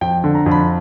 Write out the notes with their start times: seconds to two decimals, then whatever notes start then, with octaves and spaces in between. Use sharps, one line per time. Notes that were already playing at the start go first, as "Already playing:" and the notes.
0.01 F2 G5
0.24 D3
0.35 A#5
0.46 F2
0.51 B5